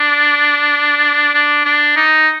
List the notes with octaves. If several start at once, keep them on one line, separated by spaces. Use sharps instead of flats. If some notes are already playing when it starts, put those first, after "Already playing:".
Already playing: D4
D4
D4
D#4